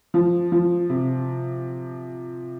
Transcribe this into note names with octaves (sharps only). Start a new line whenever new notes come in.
F3
F3
C3